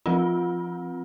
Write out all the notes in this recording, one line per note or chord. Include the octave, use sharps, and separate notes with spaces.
F3 C4 F4